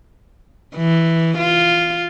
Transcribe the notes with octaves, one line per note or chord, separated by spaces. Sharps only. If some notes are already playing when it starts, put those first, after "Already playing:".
E3
F4